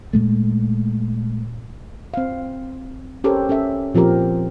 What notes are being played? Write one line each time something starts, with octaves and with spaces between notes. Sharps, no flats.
A#2 G#3 A3
C4 F5
C#4 G4 A4 A#4 C5 C#5
C#4 A4 E5
A#2 F3 C4 G4 A#4